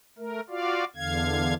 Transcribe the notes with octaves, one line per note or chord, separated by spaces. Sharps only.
A3 A#4
F4 F#4 D5 F5
E2 D3 F5 G#6